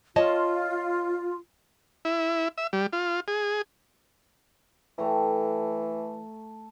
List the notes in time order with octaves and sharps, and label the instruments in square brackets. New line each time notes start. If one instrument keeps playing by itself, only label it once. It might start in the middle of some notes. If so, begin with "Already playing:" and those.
[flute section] F4 [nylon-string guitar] C#5 D#5 A5
[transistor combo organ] E4
E5
G3
F4
G#4
[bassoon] E3 [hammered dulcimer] A3 G5 A#5